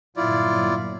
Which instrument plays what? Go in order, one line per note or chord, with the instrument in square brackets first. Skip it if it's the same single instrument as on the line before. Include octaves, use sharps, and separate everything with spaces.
[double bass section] G1 A#2 F#3 [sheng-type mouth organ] E4 F4 D5